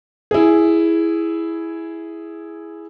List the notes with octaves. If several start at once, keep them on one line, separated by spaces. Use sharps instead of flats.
E4 G#4